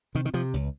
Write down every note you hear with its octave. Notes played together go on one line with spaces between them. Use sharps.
C3 D#3
D#3
C3 F3
C#2